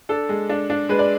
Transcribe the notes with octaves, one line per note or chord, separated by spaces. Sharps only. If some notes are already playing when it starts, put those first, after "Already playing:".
D4 A4
G#3
D4
D4
G#3 B4
D5